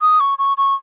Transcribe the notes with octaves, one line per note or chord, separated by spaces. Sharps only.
D#6
C#6
C#6
C#6